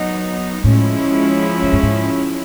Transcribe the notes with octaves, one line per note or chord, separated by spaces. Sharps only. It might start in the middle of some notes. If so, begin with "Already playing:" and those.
Already playing: F#3 B3 D#4
A2 F3 G#3 C#4 E4
G#2
G2
G#2